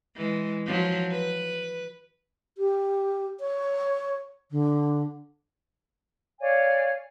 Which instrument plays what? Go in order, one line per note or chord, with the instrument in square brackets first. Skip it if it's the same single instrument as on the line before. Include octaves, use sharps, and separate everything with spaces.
[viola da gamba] E3 G#3
F3 F#3
B4
[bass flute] G4
C#5
D3
[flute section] C#5 D5 F5 G#5